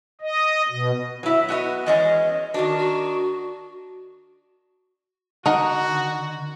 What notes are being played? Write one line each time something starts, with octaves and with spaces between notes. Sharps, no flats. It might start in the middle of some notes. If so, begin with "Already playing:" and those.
D#5
B2
F#3 E4
B3 F#4 D#5
E2 G#3 C#4 D#5
D#3 D4 F#4
F#4
D3 D#4 F#4 A#4 F#5